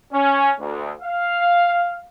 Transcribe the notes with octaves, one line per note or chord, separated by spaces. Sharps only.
C#4
D2
F5